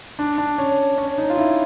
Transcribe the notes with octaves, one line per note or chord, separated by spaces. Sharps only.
D4
D4
C#4
C#4
D#4
F4
E4